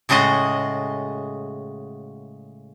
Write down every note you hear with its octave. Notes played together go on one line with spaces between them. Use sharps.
A2 C#3 G#3 F#4 D#5